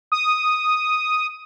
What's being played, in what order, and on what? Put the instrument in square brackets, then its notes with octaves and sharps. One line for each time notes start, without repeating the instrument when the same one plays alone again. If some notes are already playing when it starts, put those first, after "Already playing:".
[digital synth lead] D#6